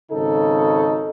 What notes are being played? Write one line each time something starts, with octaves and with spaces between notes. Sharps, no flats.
G#1 C#3 D#4 A4